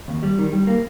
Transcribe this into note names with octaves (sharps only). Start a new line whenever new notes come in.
D#2
G3
D#3
G3
A#3